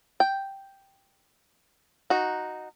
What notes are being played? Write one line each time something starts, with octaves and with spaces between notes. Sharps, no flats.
G5
D#4 F#4